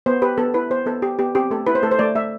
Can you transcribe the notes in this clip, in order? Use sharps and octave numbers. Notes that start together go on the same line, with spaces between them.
B3 C5
G4 B4
B3 A4
E4 B4
B3 C5
B3 A4
G4
B3 G4
C4 G4
A3 A4
E4 B4
C5
A3 A4
C5
A3 D5
A3 E5